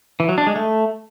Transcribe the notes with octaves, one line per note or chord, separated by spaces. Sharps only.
E3
F#3
D4
G#3
A3